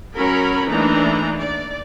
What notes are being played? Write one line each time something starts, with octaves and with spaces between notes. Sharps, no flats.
F#3 C#4 A#4 C#5 A#5 B5
E3 A3 A#3 D4 D#4 A#5
D5